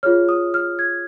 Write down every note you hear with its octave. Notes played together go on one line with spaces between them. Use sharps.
F4 G#4 C#5 F6
D#6
F6
G#6